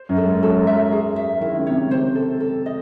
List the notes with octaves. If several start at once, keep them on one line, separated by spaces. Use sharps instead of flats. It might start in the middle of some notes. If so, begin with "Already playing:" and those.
Already playing: C5
F#2
A4
G#2
F#3 A4
F#3 E5
G#4
E5
D#3 E4
C#3
C3 C#5
C#3
C3 C5
A4
A4
D#5